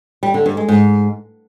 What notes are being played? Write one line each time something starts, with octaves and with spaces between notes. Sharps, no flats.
G3
D3
G2
G#3
G#2